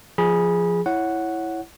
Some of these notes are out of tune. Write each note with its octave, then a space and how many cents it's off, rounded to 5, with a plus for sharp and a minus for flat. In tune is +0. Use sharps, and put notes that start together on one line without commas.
F3 -5 G#4 +0 B5 -30
E4 +0 C#5 +0 F#5 +0